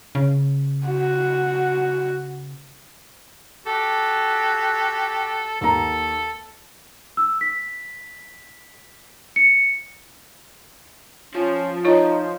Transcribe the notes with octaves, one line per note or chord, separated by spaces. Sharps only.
C#3
F#4
F#4 G4 A4
D#2 A4 A#5
E6
B6
C#7
F3 C#4
D#4 F4 C#5